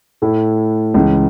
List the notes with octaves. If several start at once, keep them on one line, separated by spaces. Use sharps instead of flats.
A2 A3 E4
C#2 C#3 E3